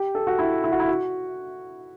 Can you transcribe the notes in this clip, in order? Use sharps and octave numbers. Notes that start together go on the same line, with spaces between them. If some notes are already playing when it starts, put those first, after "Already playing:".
Already playing: G4
A4
F#4
E4
E4
F#4
E4
F#4